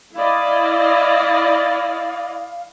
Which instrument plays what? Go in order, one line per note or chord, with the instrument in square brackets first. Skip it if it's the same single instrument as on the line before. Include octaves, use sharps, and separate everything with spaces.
[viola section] E4 D5 D#5 [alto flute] F5